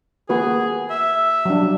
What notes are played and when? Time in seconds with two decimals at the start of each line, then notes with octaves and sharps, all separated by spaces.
0.29 A#3 F#4 G#4 B4
0.90 E5
1.45 F#3 G3 D4